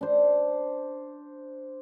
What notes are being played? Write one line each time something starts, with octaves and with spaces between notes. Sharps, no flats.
D4 C5